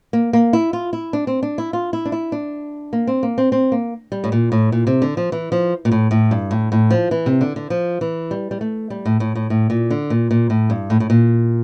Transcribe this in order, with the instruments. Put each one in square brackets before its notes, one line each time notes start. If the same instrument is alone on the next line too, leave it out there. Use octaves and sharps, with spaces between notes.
[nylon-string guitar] A#3
A#3
E4
F4
E4
D4
C4
D4
E4
F4
E4
D4
E4
D4
A#3
C4
A#3
C4
C4
A#3
G3
A2
A#2
A2
A#2
C3
D3
F3
E3
F3
A#2
A2
A2
G2
A2
A2
F3
E3
C3
D3
D3
F3
E3
G3
G3
A3
G3
A2
A2
A2
A2
A#2
D3
A#2
A#2
A2
G2
A2
A2
A#2